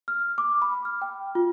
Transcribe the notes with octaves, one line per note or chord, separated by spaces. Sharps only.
F6
D6
B5
F6
G5
F4